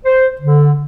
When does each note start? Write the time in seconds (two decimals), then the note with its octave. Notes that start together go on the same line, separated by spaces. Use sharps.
0.05 C5
0.41 D3